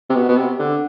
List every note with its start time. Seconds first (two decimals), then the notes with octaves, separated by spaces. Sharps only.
0.09 C3
0.15 B2
0.28 B2
0.37 C3
0.59 D3